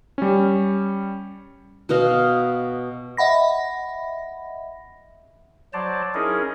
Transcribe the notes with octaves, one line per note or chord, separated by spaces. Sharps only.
G3 C#4
B2 B3 D#5 F5
D#5 E5 F#5 B5 A#6
F#3 C5 D5 A5
C#4 D#4 E4 G#4 A#4